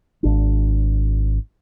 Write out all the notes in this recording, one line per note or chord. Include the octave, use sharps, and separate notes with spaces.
G#1 D4